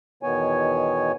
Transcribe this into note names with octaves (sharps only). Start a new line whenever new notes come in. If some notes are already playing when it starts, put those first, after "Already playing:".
E2 B2 D#3 B3 C#5 G#5